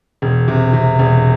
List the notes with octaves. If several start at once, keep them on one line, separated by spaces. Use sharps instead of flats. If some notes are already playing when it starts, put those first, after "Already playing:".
E1
C3
C3
E1